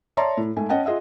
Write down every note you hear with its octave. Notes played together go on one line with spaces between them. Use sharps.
C#5 D5 E5 A5 A#5 C6
A2
G#2 A3 G#5
C#4 D#5 F#5 G5 A5
F4 G#4 D#5 E5 F#5